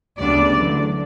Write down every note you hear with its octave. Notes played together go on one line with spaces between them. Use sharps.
D2 C#3 G3 B3 D4 D5
E2 D3 F#3 A3